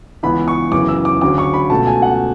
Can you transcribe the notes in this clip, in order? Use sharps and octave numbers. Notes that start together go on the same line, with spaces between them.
C#2 C#3 E3 B3 B5
C#6
F#1 F#2 C#3 E3 D6
E6
D6
D2 C#3 F#3 D6
C#6
B5
C#2 B2 A3 A5
G#5
F#5